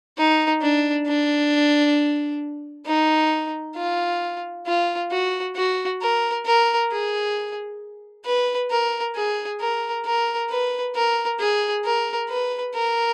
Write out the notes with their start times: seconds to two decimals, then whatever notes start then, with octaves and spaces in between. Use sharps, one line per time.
0.18 D#4
0.61 D4
1.07 D4
2.86 D#4
3.76 F4
4.66 F4
5.11 F#4
5.56 F#4
6.02 A#4
6.46 A#4
6.91 G#4
8.25 B4
8.71 A#4
9.16 G#4
9.60 A#4
10.06 A#4
10.49 B4
10.95 A#4
11.39 G#4
11.84 A#4
12.29 B4
12.75 A#4